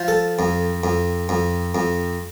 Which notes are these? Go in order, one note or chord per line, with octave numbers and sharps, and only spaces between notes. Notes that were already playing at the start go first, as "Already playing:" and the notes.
Already playing: F3
A4
F2
F2
F2
F2